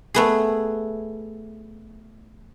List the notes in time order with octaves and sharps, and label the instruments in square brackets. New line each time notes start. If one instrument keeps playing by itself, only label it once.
[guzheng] A3 B3 G#4